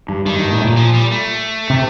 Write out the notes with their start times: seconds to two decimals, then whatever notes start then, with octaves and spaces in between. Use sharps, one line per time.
0.09 G2
0.26 G2 D#3
0.39 G2
0.52 A2
0.64 A#2
0.77 F3
0.94 G3
1.11 A3
1.70 C3